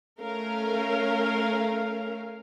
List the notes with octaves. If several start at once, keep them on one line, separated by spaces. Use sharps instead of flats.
A3 C#4 A#4 F5